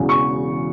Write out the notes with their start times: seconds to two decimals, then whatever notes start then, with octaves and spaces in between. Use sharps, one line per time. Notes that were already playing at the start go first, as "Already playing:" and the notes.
Already playing: E1 E2 C#3 F#3
0.09 C#6